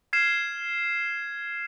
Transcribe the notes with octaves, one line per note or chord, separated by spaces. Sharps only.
F6 G#6 C7 E7